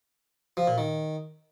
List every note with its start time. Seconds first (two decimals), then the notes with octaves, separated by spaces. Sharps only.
0.57 F3
0.67 A#2
0.78 D#3